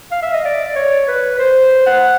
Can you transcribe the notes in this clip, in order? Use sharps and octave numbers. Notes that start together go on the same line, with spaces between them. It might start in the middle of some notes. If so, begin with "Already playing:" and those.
F5
E5
D#5
D5
C#5
B4
C5
F#5